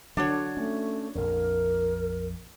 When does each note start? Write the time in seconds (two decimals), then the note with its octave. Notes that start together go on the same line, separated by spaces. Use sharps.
0.17 D3 F#3 D4 F#4 C#5
0.57 A3 C#4
1.15 A#1 F2 A#4